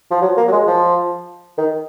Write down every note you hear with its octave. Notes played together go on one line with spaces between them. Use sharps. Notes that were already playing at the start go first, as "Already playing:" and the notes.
F3
F#3
A#3
F#3
G#3
F3
D#3